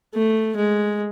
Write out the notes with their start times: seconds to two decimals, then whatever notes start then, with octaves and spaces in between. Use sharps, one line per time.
0.14 A3
0.56 G#3